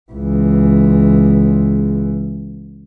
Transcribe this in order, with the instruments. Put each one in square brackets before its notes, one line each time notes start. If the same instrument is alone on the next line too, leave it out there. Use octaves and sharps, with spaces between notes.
[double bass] C#2 E3